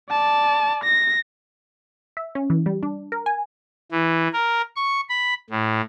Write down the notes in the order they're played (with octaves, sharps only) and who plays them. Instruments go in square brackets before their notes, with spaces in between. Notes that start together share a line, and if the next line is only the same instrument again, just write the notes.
[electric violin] D5 A5
A#6
[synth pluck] E5
C#4
E3
G3
D4
A#4
G#5
[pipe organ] E3
A#4
C#6
B5
A2